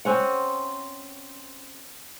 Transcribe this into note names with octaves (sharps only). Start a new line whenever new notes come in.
C4 C#4 F#5